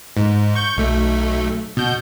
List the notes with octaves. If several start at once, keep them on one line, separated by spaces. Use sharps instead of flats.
G#2
C#6 G6
B1 A3
B2 G6